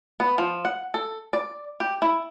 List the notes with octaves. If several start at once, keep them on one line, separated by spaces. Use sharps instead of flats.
B3
F3
F#5
A4
D5
G4
E4